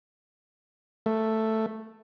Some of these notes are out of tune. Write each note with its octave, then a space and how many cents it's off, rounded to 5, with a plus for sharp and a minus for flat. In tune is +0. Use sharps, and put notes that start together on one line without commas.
A3 +5